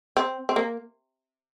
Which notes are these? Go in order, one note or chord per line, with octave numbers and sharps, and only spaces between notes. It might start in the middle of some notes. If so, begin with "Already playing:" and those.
C4
C4
A#3